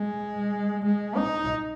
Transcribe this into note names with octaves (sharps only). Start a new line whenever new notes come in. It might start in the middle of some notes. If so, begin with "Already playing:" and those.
Already playing: G#3
G#3
D#4